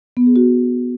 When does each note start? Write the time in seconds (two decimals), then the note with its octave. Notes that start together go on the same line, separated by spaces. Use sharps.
0.17 B3
0.26 G#4
0.36 F#4